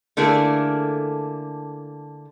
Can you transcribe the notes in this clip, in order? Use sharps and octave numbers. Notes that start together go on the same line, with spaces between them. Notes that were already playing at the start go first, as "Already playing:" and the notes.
D3 A3 A#3 E4 G#4